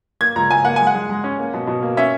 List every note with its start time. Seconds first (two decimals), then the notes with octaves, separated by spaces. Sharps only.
0.21 A#3 G#6
0.36 C#2 A#5
0.50 C#2 G#5
0.65 A#3 F#5
0.76 G#3 G#5
0.87 F#5
0.95 G#3
1.10 G#3
1.24 C#4
1.39 A#3
1.54 B2
1.67 B2
1.82 A#3
1.97 C#4 E5